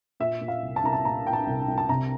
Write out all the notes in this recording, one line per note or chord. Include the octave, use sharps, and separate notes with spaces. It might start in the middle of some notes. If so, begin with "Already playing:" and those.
A#2 E5
A#2
F5
C2
A5
C2 A#5
A5
A#2 A#5
A#2 G5
A5
C2
C2
A5
C3 A#5